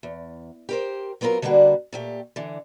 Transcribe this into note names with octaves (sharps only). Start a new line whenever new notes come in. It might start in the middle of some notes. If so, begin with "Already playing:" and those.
E2
G4 A#4 C5
F#3 B3 C4 F4 A#4
D3 G3 A#3 D4 F#4 B4
A#2 A3 G4
D3 E3